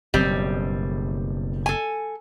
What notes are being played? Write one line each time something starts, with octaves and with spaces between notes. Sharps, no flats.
F#1 B2 G3 C4
A4 G#5